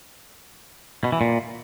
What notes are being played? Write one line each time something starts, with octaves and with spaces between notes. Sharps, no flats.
B2
E3
A#2